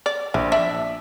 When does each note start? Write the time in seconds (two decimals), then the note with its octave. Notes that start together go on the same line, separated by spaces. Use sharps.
0.06 D5
0.34 A#1 E3
0.52 D4 E5